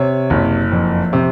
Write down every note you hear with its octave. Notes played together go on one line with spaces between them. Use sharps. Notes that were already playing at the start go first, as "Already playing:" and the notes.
Already playing: C3 C#5
F#1
F2
C3